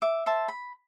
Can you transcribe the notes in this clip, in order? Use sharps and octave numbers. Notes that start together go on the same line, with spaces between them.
E5 D6
C5 E5 A5
B5